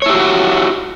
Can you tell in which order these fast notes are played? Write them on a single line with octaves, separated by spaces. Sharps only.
C#5 E4 G4 F#4 F#5